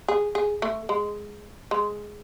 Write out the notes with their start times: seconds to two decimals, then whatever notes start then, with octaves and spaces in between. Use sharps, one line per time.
0.08 G#4
0.35 G#4
0.62 A3
0.89 G#3
1.71 G#3